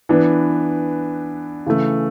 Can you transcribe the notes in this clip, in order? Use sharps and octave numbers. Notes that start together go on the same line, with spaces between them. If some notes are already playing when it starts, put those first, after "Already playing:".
E3 B3 D4
C#3 E3 A3